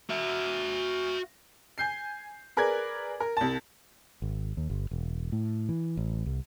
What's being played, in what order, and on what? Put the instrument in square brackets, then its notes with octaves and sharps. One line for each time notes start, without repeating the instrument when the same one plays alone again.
[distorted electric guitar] F#4 E5
[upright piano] G#5 G6 C7
G#4 A#4 B4 D5 G#6
A#4
C2 A5
[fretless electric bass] G#1
D#2
G1
E1
A2
E3
A1
C2